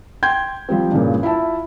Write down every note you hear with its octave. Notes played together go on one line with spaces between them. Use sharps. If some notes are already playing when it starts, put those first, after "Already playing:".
G5 C6 G6 G#6
F3 G3 C4
G2 A#2 C#3 D4
E4 F4 E5 A5